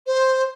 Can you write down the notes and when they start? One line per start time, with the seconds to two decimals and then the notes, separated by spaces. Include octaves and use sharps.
0.06 C5